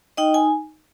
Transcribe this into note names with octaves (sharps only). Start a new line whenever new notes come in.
D#4 D#5 G5
G#5